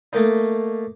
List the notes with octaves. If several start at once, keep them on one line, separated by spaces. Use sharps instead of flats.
A3 A#3 D#4